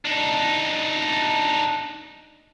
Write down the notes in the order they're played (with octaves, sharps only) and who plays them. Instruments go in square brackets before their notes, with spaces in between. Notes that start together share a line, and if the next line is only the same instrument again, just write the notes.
[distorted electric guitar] D4 D#4